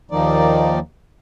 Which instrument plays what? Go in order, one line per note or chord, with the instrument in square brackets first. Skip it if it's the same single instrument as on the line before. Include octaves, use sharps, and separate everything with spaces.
[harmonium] D#2 D#3 F3 A#3 D#4 D5